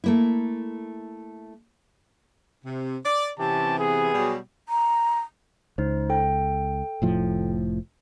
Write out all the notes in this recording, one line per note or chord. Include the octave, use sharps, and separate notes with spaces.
A3 A#3 E4
C3
D5
C3 E3 C#4 G4 A5
B3 G#4
B2 F#3 G3
A#5
C#2 D#4 C5
A4 G5
F1 A2 F3